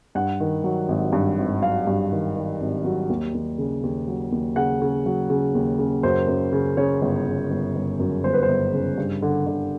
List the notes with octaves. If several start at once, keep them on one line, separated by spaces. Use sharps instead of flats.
G2 F#5
D#3
F#3
G#1
G2
G#1
F#3 F5
G2
D#3
D#3
G#1
F#3
D#2
D#2
C#3
D#2
F#3
D#2
C#3 F#5
C#3
F#3
C#3
D#2
C#3
F#2 C5
F#2
C#3
C#3 C#5
G1
C#3
G1
G1
F#2
G1 C5
B4
C5
G1
C#3
G2
D3
D3